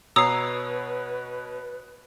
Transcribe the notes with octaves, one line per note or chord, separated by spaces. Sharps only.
B2 B4 C#5 A#5 D#6 E6 C7